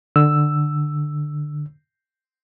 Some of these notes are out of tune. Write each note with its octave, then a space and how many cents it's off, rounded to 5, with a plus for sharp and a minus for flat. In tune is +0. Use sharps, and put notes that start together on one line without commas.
D3 +20 E6 +5